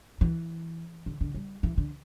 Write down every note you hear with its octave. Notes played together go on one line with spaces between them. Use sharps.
E3
D3
D3
G3
E3
D3